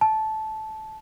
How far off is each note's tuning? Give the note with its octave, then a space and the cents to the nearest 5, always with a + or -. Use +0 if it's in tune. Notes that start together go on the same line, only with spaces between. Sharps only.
A5 -15